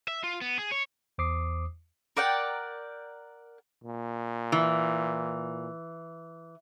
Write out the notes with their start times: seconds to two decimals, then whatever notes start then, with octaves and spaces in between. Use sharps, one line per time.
0.08 E5
0.24 F4
0.41 B3
0.59 G#4
0.72 C#5
1.18 E2 C5 D6 D#6 C7
2.17 A#4 D5 F#5 G5
3.84 A#2
4.52 E3